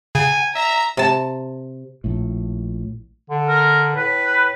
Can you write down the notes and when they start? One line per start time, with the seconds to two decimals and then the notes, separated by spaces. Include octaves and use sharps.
0.15 C#3 G#5
0.55 E5 A#5
0.97 C3 A5
2.04 A#1 A2
3.30 D3
3.48 A#4
3.96 A2 B4